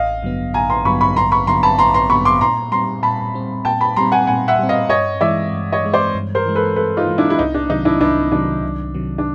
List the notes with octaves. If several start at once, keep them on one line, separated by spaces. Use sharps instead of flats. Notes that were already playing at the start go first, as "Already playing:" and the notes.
Already playing: A1 D#5 F5
G2 D3 F#3 B3
A1 G#5 A#5
A#5 C6
G2 D3 F#3 B3 B5 C#6
B5 C#6
A1 A#5 C6
B5 C#6
G2 D3 F#3 B3 A#5 C6
A5 B5
A1 A#5 C6
A#5 C6
G2 D3 F#3 B3 B5 C#6
C6 D6
A#2 A#5 C6
G3 C4 A#5 C6
A#2 A5 B5
G3 C4
A#2 G5 A5
A5 B5
G3 C4 A#5 C6
F#5 G#5
A#2 F#5 G#5
E5 F#5
G3 C4
D#5 F5
G2 C#5 D#5
E3 G#3 D5 E5
G2
C#5 D#5
E3 G#3
C5 D5
G2
A#4 C5
E3 G#3
A4 B4
G2 A4 B4
D#4 F4
E3 G#3
D4 E4
E4
C2 D#4
D4
C3 D#3 F#3 D#4
D4 E4
C2 D4 E4
C3 D#3 F#3 D4
C2
C3 D#3 F#3
D4